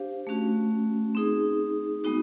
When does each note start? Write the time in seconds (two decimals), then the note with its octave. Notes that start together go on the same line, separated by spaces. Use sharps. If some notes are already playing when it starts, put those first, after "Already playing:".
Already playing: D4 G4 C5 F5
0.27 A3 C#4 F#4
1.15 C4 D#4 G#4
2.04 G#3 B3 D#4 F#4